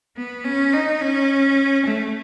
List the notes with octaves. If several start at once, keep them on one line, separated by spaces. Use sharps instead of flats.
B3
C#4
D#4
C#4
A3